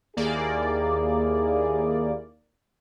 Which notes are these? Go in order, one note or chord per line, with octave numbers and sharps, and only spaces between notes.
D#2 A#3 E4 G4 G#4 D5